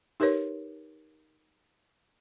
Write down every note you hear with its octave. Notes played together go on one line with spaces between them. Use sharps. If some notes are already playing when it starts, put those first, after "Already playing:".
D#4 G4 A#4 B4 C#5